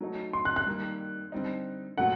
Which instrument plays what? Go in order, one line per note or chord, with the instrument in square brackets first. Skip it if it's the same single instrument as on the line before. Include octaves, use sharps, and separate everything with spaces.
[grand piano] F#3 A3 D#4
[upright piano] C6
F#6
F#6
[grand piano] D#3 G3 A#3
D3 G3 C4 D#4
[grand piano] A#2 F#3 A3 [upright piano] F#5